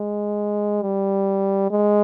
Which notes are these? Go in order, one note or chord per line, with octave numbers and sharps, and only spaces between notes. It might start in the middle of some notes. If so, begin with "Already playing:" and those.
Already playing: G#3
G3
G#3